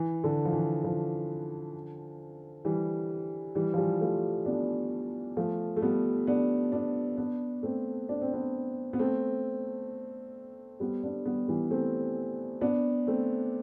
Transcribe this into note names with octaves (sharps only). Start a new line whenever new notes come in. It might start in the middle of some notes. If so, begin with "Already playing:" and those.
Already playing: E3
D3
F3
E3
D3 F3
E3 G3
E3 G3
F3
E3 G3
F3 A3
B3 D4
F3 A3
A3
G3 B3
B3 D4
B3 D4
B3 D4
A3 C4
D4
C4
B3 D4
B3
A3 C4
G3 B3
B3 D4
G3 B3
E3 G3
A3 C4
B3 D4
A3 C4